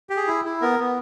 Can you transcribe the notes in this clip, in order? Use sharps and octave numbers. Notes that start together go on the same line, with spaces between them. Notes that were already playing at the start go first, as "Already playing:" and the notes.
G4
G#4
E4
E4
B3 A#4
B3